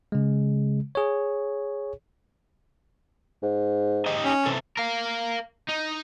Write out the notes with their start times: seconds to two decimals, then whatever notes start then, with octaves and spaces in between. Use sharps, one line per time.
0.12 C#3 G#3
0.95 G#4 C#5
3.43 G#2
4.06 D#4 G4 D#5
4.25 C#4
4.46 C3 E3 A4
4.77 A#4 F5
5.69 D#4